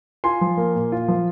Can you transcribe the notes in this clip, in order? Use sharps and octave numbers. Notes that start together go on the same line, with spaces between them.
F4 G#5 C6
F3
A#3
A#2
F4
F3